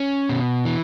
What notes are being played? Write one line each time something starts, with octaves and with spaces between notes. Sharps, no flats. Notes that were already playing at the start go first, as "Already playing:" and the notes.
Already playing: C#4
B2
E3